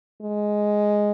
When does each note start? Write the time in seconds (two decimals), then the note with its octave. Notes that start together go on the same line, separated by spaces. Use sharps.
0.22 G#3